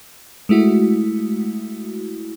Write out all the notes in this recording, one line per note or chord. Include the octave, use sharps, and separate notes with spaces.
G#3 A3 E4 F#4